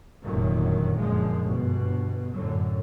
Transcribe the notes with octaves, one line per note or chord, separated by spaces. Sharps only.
F1 F#2 A#2 D3 D#3 F#3
F#2 A#2 D3 F3 G#3
G1 B2
F#2 A2 D3 F#3